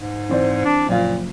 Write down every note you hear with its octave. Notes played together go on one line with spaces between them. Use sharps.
G#2
E3 C4 D5
D4
F#1 A#2 F3 F5